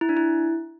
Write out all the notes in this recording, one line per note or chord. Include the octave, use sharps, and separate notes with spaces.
E4
D4
E4